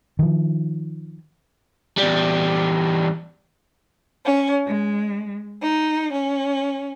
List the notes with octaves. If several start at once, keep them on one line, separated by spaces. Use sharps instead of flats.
D#3 F3
E2 G3
C#4
G#3
D#4
C#4